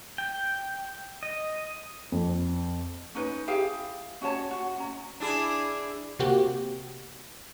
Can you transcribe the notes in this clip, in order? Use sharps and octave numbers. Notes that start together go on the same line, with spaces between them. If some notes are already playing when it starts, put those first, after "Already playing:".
G5
D#5
F2
C#4 D#4 B4
E4 G4 G#4 F5
C#4 F#4 C#5 A5
F#4
C#4 A#5
D4 E4 G#4
C3 A#3 F#4 G4